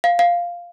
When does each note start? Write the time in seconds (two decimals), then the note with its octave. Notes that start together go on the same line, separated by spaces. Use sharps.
0.04 F5
0.19 F5